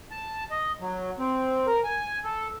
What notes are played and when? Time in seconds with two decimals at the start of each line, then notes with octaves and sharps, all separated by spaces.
0.11 A5
0.51 D#5
0.80 F#3
1.19 C4
1.67 A#4
1.84 G#5
2.24 A4